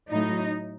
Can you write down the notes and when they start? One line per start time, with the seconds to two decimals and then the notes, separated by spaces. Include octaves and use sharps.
0.10 A2 F#3 A3 D#4